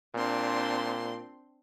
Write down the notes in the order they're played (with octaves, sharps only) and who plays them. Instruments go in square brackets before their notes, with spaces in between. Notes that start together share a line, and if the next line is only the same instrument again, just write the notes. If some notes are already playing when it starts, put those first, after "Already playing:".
[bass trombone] A#2 [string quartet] C4 D4 C6